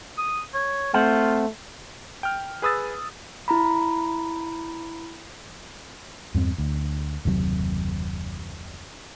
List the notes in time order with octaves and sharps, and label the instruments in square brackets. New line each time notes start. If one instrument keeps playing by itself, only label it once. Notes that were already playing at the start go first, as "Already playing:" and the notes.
[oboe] D#6
C#5
[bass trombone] A3 [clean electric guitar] C4 C5 F#5 [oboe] F4
[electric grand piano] G5 F6
G#4 B4 D#6 E6 A6
[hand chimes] E4 A#5 B5
[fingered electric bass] E2 G2 A#3 C4
D2
F#1 D#2 C3 F#3